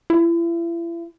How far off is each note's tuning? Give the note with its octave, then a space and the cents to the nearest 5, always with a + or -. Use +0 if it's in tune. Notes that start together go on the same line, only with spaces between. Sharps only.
E4 +40